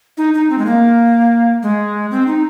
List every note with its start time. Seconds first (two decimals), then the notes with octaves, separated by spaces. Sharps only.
0.18 D#4
0.34 D#4
0.50 C4
0.58 G#3
0.66 A#3
1.63 G#3
2.11 C4
2.27 D#4